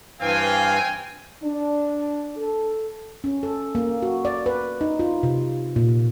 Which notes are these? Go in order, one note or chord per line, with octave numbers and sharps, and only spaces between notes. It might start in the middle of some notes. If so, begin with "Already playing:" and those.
G2 E3 C4 F5 G5 G#5
D4
A4
C#4
A4
A#3
F#4
D5
B4
D#4
F4
C3
A#2